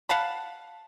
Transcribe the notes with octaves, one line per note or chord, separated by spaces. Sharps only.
F5 F#5 A5 B5